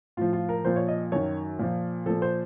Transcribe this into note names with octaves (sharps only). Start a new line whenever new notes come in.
A2 F3 F4
F4
A#4
A#2 F3 C5
C#5
D#5
F#2 D#3 C#5
A#2 F3
A#2 F3 A4
C5